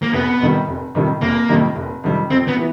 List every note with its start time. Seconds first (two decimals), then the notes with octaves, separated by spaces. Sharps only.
0.02 A#3
0.13 F1 B3
0.41 F2 C3 D#3 G3
0.68 F1
0.95 F2 C3 D#3 G3
1.22 F1 A#3
1.49 F2 C3 D#3 G3
1.76 F1
2.04 F2 C3 D#3 G3
2.30 F2 C4
2.48 B3
2.57 E3